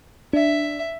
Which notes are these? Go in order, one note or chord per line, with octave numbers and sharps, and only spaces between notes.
D4 E5